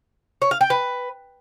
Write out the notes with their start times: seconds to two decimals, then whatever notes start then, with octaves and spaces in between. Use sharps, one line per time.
0.42 C#5
0.51 F5
0.61 G5
0.70 B4